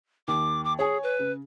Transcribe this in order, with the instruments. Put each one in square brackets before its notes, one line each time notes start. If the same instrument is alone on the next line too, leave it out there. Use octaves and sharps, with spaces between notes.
[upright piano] D#2 [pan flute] D6
[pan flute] D6
[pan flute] G#4 [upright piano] C#5 G#5
[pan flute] B4
[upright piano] C#3